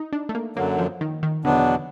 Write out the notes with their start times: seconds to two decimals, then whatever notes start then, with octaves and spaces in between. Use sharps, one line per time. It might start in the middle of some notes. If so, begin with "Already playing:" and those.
Already playing: D#4
0.13 D4
0.29 A3
0.35 A#3
0.56 F#2 D3 F#3 A#3
0.79 F3
1.01 D#3
1.23 D#3
1.44 E2 B2 D3 F#3 B3 D4